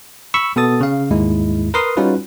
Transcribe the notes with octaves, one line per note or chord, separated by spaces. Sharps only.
B5 C#6 E6
B2 B3 A4 D#6 A6
C#3 F5
D#2 G#2 G#3 E4
A#4 B4 A#5 C6 D#6
G3 C#4 D#4 F4 F#4 B4